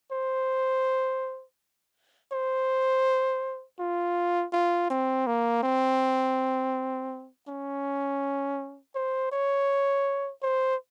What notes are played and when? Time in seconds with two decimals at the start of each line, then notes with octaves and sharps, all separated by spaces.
0.12 C5
2.32 C5
3.79 F4
4.53 F4
4.90 C4
5.27 A#3
5.63 C4
7.48 C#4
8.95 C5
9.32 C#5
10.43 C5